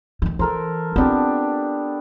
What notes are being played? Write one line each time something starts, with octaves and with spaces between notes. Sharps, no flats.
D2 D#3
E3 A4 A#4 C5
B3 C4 D4 F4 G4